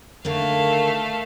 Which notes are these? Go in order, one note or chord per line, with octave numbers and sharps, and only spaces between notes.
D3 D#3 A3 A#3 F5